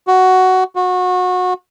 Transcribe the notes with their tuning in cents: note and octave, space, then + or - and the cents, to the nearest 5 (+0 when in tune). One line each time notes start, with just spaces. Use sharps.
F#4 +10
F#4 -25